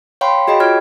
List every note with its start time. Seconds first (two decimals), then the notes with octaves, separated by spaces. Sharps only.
0.21 C#5 F5 G5 B5 C6
0.48 F#4 G#4 D#5 G5 B5
0.60 F4 C#5 F6 G#6